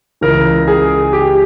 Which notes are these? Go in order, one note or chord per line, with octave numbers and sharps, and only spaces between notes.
C#2 C#3 E3 A#4
G#4
G4